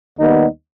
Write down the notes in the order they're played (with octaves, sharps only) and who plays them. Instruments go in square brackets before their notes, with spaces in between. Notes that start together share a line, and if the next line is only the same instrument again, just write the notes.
[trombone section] D#2 D#3 G3 B3 D#4